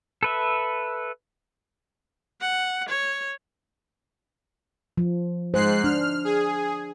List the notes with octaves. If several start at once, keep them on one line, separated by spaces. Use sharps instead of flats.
A4 B4 E5
F#5
C#5
F3
G#2 C5 F#6 C7
D4 F6
G#4